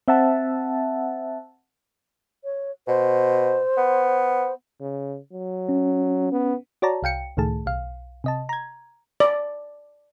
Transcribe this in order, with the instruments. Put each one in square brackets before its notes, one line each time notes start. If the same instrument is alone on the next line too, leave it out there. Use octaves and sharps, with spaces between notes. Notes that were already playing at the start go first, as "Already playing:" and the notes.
[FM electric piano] C4 E5 F#5 A5
[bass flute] C#5
[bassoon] B2 [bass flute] C5
[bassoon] B3
[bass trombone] C#3
F#3
[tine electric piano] C#4
[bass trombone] B3
[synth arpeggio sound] F#4 C#5 D5 A5 A#5
C2 F5 G5 C#7
C#2 A2 D#3 A3 G#4 A5
B1 F5
C3 D#5 A5
A#5 G#6
[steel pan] D5